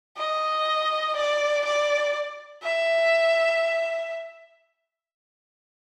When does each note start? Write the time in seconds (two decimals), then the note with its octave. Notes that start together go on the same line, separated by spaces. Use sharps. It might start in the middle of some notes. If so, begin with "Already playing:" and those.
0.18 D#5
1.16 D5
1.65 D5
2.63 E5